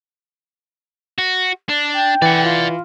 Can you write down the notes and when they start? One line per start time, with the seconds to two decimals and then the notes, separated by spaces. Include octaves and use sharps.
1.18 F#4
1.69 D4 D5
1.93 G5
2.22 E3 D5 F#5
2.43 F4